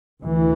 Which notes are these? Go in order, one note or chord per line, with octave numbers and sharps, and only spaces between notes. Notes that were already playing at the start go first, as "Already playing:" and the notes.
D2 E3